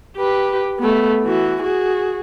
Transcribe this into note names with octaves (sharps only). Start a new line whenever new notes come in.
G4 B4
A3 B3
E3 F#4
F#4 G#4